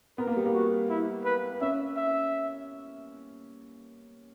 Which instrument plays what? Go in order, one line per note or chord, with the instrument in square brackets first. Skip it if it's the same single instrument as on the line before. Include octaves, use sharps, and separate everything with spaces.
[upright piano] B3 [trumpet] A#4
[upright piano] A#3
G3
A#3
[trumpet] F#4
E4
B4
[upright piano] C#4 [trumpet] E5
[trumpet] E5